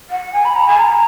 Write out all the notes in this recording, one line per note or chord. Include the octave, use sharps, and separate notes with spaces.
F#5
G#5
B5
A#5
G#5
A#5